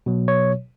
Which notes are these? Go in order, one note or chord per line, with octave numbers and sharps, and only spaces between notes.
B2 F#3
C#5